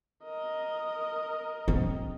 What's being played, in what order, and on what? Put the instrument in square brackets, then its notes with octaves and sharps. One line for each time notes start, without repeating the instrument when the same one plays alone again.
[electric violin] A#4 D#5
[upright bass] C4